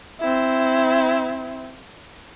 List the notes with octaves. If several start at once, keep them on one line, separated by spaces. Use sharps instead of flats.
C4 E4